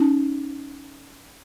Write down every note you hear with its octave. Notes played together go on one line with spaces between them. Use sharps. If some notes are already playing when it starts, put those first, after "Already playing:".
Already playing: C#4 D#4